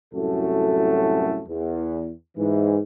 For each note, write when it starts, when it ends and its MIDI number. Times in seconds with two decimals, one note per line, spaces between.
0.14 1.42 36
0.14 1.42 42
0.14 1.42 45
0.14 1.42 57
0.14 1.42 66
0.14 1.42 69
1.48 2.11 40
2.38 2.80 44
2.38 2.80 52